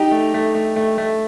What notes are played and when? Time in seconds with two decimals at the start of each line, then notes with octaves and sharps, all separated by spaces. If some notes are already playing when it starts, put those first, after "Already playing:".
Already playing: D#4 G4
0.11 A3
0.34 A3
0.55 A3
0.76 A3
0.98 A3